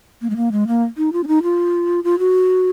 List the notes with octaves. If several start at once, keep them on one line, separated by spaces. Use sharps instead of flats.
A#3
G#3
A#3
G#3
A#3
D#4
F4
C#4
D#4
F4
F4
F#4